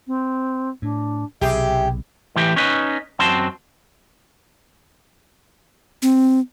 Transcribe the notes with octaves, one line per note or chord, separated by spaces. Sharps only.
C4
A2 D4
B1 C3 G4 G#4 E5
A2 E3 G4
C#4 D#4 B4
F#2 C4 F#4 A5 C6
C4